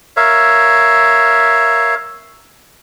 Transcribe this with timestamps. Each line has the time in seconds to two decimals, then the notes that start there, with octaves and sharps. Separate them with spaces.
0.17 A#4 C#5 E5 F5